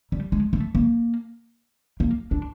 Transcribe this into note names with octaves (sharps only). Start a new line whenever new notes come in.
G3
G#3
A3
A#3
A#3
D4